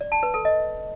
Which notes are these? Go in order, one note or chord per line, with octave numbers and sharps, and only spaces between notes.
D5
A5
B4
A4
D#5